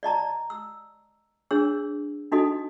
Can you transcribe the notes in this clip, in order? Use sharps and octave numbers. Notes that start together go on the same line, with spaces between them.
D5 D#5 A5 A#5
E6
D4 G#4 C#5 E6
D4 D#4 F#4 A4 D#5